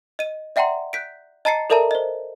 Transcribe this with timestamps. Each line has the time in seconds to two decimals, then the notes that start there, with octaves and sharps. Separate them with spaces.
0.19 D#5 D#7
0.56 D5 E5 F#5 G5 A#5 C6
0.93 F#6 G6 B6 D7
1.45 D#5 A5 A#5 A6 C7 C#7
1.70 A4 A#4 D5 E5 A5 A#5
1.91 C5 D#5